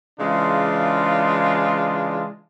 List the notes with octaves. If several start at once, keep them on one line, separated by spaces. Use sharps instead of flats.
C#3 E3 G#3 D4 F4